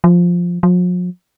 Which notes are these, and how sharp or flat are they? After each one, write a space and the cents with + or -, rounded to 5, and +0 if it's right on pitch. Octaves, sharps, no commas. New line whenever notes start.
F3 +5
F3 +45